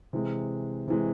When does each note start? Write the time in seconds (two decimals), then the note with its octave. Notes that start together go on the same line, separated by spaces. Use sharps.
0.13 C3 E3 G#3
0.88 C3 E3 G#3